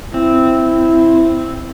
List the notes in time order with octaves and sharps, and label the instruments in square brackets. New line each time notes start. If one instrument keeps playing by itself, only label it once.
[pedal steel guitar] C4 [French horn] E4